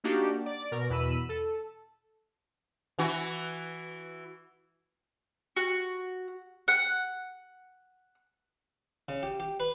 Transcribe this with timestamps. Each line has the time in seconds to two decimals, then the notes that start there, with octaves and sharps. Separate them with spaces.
0.04 A#3 D4 D#4 F#4 G4
0.46 D5
0.71 B2 A#4
0.89 E2 B2 B5 E6 D#7
1.29 A4
2.99 E3 F#4
5.56 F#4
6.68 F#5
9.09 C#3
9.23 G4
9.40 G4
9.60 B4